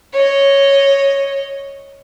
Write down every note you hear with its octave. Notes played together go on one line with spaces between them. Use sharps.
C#5 D#5